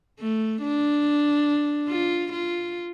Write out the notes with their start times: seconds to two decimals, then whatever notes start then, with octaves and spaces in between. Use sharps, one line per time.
0.20 A3
0.62 D4
1.89 F4
2.32 F4